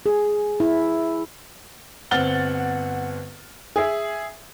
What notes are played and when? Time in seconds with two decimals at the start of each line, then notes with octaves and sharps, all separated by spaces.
0.06 G#4
0.60 E4
2.11 G1 C4 F#5 F6 A6 G7
3.76 G#4 E5